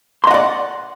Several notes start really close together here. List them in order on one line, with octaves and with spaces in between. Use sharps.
C6 D#5 F#5 D5